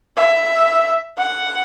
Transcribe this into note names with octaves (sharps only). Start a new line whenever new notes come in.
E5
F#5